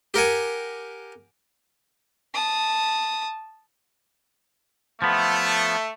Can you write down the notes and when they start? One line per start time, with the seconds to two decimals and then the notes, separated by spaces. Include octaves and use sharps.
0.14 G4 A#4 F#5 G#5
2.34 A5 D#6
5.02 F3 A3 B3